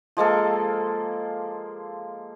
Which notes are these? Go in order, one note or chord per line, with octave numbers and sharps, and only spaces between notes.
F3 G#3 A#3 A4